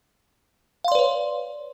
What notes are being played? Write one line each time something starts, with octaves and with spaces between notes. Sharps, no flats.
B4 C#5 D5 F5 C6